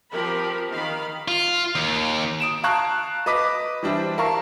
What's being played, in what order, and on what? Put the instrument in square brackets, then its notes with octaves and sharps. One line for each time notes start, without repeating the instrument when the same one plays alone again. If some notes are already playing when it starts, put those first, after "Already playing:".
[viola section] F3 C4 G4 A#4 B5
D#3 F5 B5
[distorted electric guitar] F4
D#2
[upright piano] D#6 D7 E7
F5 A5 A#5 C#6 F#6
B4 D#5 D6 B6
E3 G3 D4 E4 C5
E4 A#4 F5 A5 C#6